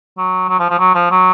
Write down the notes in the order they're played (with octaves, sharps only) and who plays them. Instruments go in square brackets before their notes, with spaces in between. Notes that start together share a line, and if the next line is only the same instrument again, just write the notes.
[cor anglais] F#3
F#3
F3
F3
F#3
F3
F#3